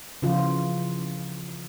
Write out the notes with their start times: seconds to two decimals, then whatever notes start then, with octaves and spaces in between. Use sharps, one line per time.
0.22 C#3 E3 F3 F4